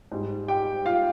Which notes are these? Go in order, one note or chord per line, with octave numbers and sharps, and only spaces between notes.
G#2 G3
G4 G5
F4 F5